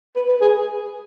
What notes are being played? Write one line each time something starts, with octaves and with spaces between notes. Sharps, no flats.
B4
B4
G#4